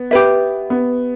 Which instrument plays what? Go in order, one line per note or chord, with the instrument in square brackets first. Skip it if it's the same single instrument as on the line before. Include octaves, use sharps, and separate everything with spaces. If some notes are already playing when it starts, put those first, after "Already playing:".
Already playing: [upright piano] B3
[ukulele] G4 B4 E5
[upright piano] B3